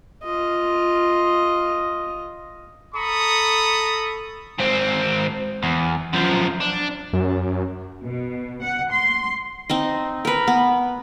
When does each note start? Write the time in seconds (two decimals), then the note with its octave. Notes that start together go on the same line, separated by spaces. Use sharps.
0.23 F4 D#5
2.95 A4 A#5 B5 C#6 D#6
4.59 G#2 C4
5.63 E2
6.13 F#2 F3
6.60 D4
7.13 F#2
8.05 B2
8.63 F#5
8.92 C6
9.69 C4 D#4 D#5
10.25 A#4 B4
10.47 B3